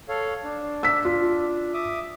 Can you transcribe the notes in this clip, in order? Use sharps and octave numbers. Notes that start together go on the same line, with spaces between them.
A4 C#5 F5
D4
E6 B6
F4
E5 D6 D#6